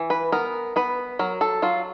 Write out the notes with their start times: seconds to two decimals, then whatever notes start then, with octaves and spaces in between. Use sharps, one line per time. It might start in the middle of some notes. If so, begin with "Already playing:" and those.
Already playing: E3
0.10 B4
0.32 B3 A#4
0.76 B3 B4
1.19 F#3 A#4
1.41 A4
1.62 F#3 F4